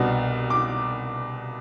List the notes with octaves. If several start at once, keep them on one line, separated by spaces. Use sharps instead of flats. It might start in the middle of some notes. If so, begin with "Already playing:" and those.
Already playing: C2 B2 B3 D4
D6